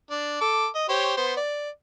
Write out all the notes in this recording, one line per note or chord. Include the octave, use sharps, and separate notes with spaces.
D4
A4 D6
D#5
G4 C5 C#5
B3 C5
D5